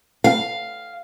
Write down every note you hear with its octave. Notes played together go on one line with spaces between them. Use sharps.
F5